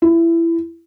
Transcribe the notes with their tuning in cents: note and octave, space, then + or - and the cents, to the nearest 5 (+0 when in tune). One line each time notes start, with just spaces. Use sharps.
E4 +20